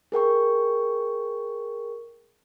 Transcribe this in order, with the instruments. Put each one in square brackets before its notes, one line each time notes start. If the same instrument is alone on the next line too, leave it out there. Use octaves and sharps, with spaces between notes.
[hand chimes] G#4 A#4 G5 C#6